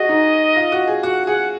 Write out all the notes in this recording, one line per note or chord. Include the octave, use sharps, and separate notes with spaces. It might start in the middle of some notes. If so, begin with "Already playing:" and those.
Already playing: F#4 G#4 D#5
D#4
F4
F#4
G#4
F#4 F#5
G#4 F#5